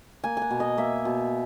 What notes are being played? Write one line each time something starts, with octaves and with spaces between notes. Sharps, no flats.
A#3 G#5
F#5 G#5
B2
D#5
A#3 E5
B2